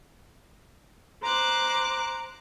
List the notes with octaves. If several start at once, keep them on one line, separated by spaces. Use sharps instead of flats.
C5 A#5 D6 F#6